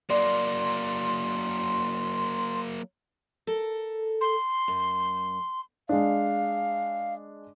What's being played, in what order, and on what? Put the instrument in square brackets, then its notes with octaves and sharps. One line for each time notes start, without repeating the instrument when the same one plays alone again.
[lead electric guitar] F#3 A#3 [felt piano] D5 [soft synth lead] C6
[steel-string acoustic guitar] A4 A#4
[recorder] C6
[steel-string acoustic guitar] F#2
[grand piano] G#3 D4 [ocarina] F5